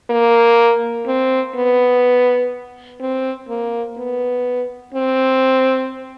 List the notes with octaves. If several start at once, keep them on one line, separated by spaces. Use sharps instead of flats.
A#3
C4
B3
C4
A#3
B3
C4